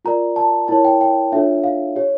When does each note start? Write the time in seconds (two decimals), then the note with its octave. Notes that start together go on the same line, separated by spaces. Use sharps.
0.05 F4 A#4 D5 A#5
0.36 A5
0.68 E4 A#4 C#5 A5
0.85 G5
1.01 G5
1.32 D4 F4 A4 C#5 E5
1.64 F5
1.96 G4 C#5